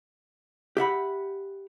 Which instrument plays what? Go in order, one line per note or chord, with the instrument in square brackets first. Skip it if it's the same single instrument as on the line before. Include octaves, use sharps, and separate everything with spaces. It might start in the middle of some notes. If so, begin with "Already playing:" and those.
[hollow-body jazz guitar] G4 E5 F#5 B5